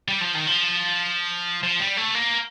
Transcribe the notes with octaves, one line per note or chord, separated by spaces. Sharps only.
G3
F3
D#3
F3
F3
G3
A3
A#3